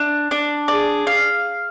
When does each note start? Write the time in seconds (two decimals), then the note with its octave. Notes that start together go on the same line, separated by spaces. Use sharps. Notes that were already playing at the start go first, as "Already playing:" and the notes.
Already playing: D4
0.31 D4
0.68 G#4 D5
1.07 F5